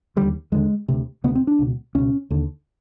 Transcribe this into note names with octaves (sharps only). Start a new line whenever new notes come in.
D#2 D3 G3
D#2 D3 G#3
D2 C3
D2 C3 B3
C4
D4
C#2 B2
C#2 B2 C#4
D#2 D3